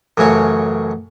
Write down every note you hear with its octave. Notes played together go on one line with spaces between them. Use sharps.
A1 F#2 A2 C#3 F#4 C#5